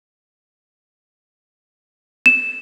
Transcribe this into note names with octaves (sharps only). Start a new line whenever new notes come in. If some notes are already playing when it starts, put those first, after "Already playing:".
E7